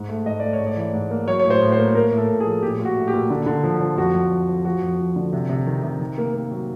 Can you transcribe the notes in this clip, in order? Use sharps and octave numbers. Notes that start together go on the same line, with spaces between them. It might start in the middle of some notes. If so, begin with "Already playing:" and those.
Already playing: G#2
A3
G#2 D#5
A3 D5
C#5
G#2
D5
E3
G#2
A#3
F#3 C#5
A2 C#5
C5
A2
C5
A#3
A#3 A#4
A2
A4
A2
G#4
F3
A#2 G4
A#2
F#4
A3
G4
A#2
D3
D3
F3
F3
F2 F#4
F2
F2
F2
F3 F#4
F2
F3
D3
C3
C3
D#3
C3
D#3
A#3
A#3
F#3